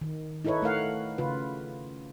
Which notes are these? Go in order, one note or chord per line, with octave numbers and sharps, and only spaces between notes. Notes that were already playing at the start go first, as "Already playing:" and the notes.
D#3
D#4 E4 A4 B4 C#5
A3 A#4 F5 F#5
C#3 F4 B4